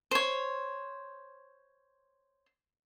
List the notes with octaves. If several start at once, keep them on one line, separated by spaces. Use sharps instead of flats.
C5 C#5